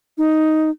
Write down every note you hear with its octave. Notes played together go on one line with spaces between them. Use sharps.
D#4